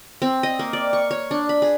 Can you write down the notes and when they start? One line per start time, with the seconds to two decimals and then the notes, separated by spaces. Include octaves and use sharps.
0.22 C4
0.43 D#5
0.59 A#3
0.73 D5
0.93 C#6
1.11 C#5
1.31 D4
1.49 B5
1.62 G#4